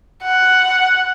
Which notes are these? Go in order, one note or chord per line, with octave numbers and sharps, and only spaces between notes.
F#5